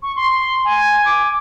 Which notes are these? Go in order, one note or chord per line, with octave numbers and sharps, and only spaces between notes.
C#6
C6
G#5
D6